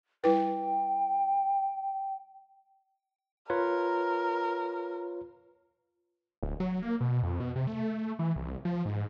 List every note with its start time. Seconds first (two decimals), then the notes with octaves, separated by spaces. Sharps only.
0.24 G3 E4 B4 G5
3.50 F4 A#4 B4 C#5
6.43 D1
6.60 F#3
6.82 A#3
7.01 B2
7.23 F2
7.40 B2
7.56 C3
7.67 A3
8.19 E3
8.36 C2
8.65 F3
8.85 G#2